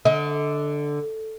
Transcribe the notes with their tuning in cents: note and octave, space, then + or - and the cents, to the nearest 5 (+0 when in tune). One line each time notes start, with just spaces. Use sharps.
D3 +0 D#5 +35